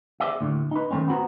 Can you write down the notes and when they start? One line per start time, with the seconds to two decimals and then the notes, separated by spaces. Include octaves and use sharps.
0.20 G#4 C5 D5 E5
0.41 D2 A2
0.71 D#4 B4
0.91 D#3 F3 A3 C4 C#4
1.08 B3 C4 F#4 C5 A#5